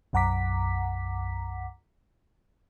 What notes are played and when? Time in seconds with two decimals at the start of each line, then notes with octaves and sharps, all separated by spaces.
0.13 B1 F#2 F#5 A#5 D6 B6